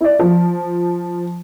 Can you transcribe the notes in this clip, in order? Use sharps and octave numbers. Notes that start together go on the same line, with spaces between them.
E4 D5
F3